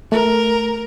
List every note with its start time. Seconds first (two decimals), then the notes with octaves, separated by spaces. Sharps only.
0.12 A3 A#4